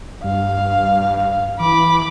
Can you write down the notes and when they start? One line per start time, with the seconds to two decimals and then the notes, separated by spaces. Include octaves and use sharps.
0.24 G2 F5
1.60 E3 B5 D6